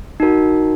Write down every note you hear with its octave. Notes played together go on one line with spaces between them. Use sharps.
D#4 F#4 A#4